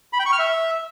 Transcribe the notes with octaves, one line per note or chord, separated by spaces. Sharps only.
B5
G5
C#6
F6
E5